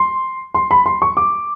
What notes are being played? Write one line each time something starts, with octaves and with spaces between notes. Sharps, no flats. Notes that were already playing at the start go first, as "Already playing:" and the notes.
Already playing: C6
C6
B5
C6
C#6
D6